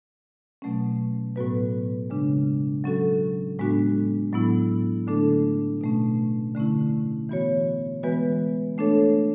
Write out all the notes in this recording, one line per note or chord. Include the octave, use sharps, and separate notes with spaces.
B2 F#3 A3 C#4
A2 F#3 B3 F#4 B4
C#3 G#3 D4
F#3 C#4 F#4 A4
A2 G#3 B3 D4 F#4
A2 F#3 B3 E4
D3 A3 D4 A4
B2 A3 C#4
D3 A3 C#4 E4
E3 B3 F#4 C#5
E3 G#3 B3 F#4 B4
A3 D4 A4 C#5